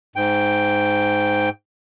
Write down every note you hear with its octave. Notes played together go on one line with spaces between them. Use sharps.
G#2 G5